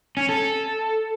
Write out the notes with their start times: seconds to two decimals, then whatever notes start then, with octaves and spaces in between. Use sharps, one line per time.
0.17 C#4
0.29 A4